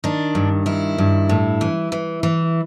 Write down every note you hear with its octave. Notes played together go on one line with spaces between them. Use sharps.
D#3 D4
G2
D#3 E4
G2
A2
E3
E3
E3